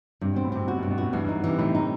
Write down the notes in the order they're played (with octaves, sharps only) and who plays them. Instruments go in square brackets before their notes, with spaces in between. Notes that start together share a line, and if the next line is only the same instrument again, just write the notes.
[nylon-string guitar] G2 [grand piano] C3
[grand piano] B2
[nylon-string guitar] C4
[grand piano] A2
[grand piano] C3 [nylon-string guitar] C4
[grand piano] C3 [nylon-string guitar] F#4
[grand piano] B2
[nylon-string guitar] G2
[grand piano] B2
[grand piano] A2 [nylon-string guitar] F#4
[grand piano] G2 [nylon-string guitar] E3
[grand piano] G2
[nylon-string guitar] D#4
[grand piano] C3 [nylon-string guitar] E3
[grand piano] A2 [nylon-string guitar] D#4
[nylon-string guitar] D#4